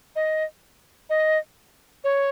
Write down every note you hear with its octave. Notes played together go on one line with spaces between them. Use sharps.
D#5
D#5
C#5